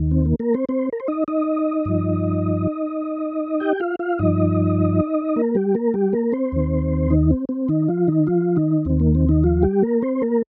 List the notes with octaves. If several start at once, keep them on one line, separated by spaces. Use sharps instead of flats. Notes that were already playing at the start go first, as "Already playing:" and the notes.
Already playing: D#2 D#3
C4
A#3
A#3 A#4
C4 C5
C4 C5
A#4
C5
D#4 D#5
D#4 D#5
G2 F3
G4 G5
F4 F5
F4 F5
G2 F3 D#4 D#5
A#3 A#4
G3 G4
A#3 A#4
G3 G4
A#3 A#4
C4 C5
D#2 D#3
D#3 D#4
C4
C4
D#3 D#4
F3 F4
D#3 D#4
F3 F4
D#3 D#4
D#2 D#3 C4
A#3
C4
D#3 D#4
F3 F4
G3 G4
A#3 A#4
C4 C5
A#3 A#4